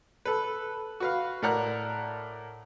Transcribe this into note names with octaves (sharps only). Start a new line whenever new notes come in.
A4 B4
F#4 B4 F5
A2 A#4 D5 F#5 A#5 F#6